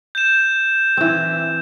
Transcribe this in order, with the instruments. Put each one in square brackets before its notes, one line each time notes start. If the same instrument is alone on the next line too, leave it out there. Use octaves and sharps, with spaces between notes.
[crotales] G6 E7
[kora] E3 C4